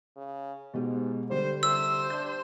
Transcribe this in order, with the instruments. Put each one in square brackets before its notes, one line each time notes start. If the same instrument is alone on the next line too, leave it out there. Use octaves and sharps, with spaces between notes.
[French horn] C#3
[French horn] G#2 [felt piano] B2 G#3 G4
[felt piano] D3 G3 [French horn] C5
[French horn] C3 [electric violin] C5 [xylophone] E6
[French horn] D4 [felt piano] G6